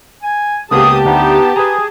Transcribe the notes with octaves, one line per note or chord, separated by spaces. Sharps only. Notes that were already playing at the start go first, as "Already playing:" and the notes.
G#5
C#2 A#3 B3 G4 G#4 A5 D#6
D2 B3 D#4
G#4 B4 G#5 A#5